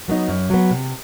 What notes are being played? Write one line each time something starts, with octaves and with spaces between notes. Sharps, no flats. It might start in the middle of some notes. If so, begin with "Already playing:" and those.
F#3 B3 D#4
F#2
F#3 B3
C3